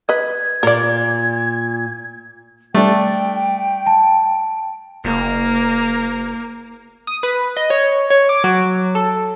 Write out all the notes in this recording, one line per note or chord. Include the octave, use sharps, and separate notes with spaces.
B4 D#5 G#6
A#2 A#4 D5
G3 A3 D4 G5
A5
F#1 A#3
D#6
B4
D#5
C#5
C#5
D6
F#3
A4